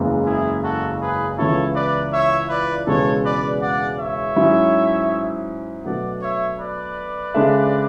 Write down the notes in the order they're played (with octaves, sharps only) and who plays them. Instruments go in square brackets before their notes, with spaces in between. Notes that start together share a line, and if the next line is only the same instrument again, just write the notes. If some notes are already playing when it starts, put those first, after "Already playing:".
Already playing: [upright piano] F#1 E2 C#3 G#3
[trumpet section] E4 G#4
F#4 A4
G#4 B4
[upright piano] C#2 C#3 E3 B3 E4 [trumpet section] A4 C#5
[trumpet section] B4 D5
C#5 E5
B4 D5
[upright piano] E1 E2 C#3 G#3 B3 [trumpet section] A4 C#5
[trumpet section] B4 D5
D5 F#5
C#5 E5
[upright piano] G#2 F#3 C#4 E4
[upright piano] B2 F#3 A3 D4 [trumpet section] D5 F#5
[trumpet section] C#5 E5
B4 D5
[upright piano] C#3 G#3 D4 A4 E5